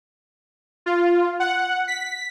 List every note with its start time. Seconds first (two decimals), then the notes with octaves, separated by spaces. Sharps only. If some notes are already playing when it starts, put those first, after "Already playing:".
0.86 F4
1.40 F#5
1.88 B6